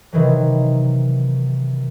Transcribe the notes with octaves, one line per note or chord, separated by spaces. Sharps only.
C3 D#3 E3 F#3